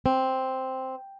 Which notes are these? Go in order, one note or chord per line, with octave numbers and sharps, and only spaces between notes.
C4